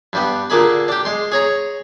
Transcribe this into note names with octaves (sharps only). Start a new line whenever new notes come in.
G2 G3 B3
A#2 D3 A#3 G#4 B5
D4 G4
G#3 C6
G#4 C#5 A#5